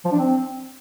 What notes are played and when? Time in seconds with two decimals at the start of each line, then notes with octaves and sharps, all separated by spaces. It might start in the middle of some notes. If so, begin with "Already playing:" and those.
0.05 F3
0.12 D4
0.19 C4